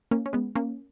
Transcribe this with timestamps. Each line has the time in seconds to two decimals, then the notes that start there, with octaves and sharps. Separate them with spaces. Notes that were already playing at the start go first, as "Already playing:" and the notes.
0.11 A#3 C#4
0.26 C#4
0.33 G#3 B3
0.55 A#3 C#4